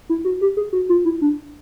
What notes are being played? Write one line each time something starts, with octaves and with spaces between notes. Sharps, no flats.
E4
F#4
G4
G#4
F#4
F4
E4
D4